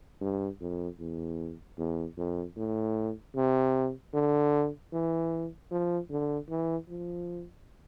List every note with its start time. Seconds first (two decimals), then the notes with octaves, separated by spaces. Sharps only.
0.21 G2
0.61 F2
0.99 E2
1.78 E2
2.17 F2
2.56 A2
3.36 C3
4.13 D3
4.92 E3
5.71 F3
6.10 D3
6.49 E3
6.89 F3